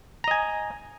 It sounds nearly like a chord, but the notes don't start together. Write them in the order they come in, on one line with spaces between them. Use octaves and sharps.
A#5 D#5 G#5